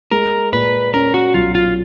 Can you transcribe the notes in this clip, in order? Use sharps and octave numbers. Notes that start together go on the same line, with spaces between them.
G#3 A#4
A#2 B4
C#4 A#4
F#4
B1 F4
F4